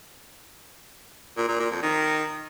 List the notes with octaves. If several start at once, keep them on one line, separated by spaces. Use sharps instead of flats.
A#2
A#2
A#2
F2
D#3